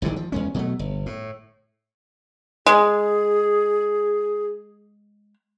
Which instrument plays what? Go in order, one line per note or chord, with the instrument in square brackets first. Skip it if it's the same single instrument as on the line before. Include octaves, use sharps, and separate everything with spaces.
[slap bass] A#1 G#2 D3 D#3
F3
E2 G#3 C#4
B2 F#3 A3
G1
A2
[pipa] G#3 [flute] G#4